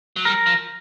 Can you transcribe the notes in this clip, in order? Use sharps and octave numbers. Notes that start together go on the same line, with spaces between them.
F#3
G3 A#4
F3